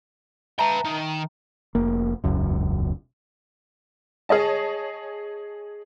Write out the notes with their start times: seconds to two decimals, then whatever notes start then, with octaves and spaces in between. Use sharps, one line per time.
0.59 B4 E5 G5 A5 A#5
0.85 D#3
1.75 F1 A#3
2.24 E1 C#2 F#2
4.29 G#4 C#5 D#5 A5